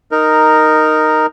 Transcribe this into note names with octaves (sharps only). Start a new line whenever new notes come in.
D#4 A#4